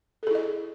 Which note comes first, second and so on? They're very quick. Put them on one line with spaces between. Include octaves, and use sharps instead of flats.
A4 G#4 E4 D#5